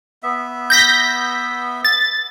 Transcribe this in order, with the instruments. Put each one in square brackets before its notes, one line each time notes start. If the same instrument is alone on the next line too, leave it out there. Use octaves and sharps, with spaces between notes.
[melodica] B3 E5
[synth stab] G6 A#6 B6
A6